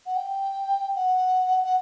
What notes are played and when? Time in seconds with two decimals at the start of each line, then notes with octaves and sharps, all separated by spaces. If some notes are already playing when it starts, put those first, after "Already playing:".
0.06 F#5
0.16 G5
0.96 F#5
1.64 F#5